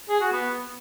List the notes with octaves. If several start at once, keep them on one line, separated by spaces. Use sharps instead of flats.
G#4
F#4
B3